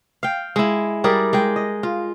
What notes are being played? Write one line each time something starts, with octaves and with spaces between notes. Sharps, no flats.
F5 G5
G#3 E4
G3 G#4 A#4 D5
G#3 G5
D#5
F4